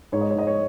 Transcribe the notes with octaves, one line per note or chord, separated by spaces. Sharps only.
G#2 C#5
D#5
C#5
G#2 D#5
C#5